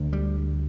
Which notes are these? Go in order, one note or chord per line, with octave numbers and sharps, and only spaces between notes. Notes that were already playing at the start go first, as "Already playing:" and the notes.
Already playing: D2 D3
G3